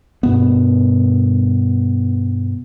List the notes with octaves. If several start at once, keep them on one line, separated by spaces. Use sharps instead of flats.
G2 B2 B3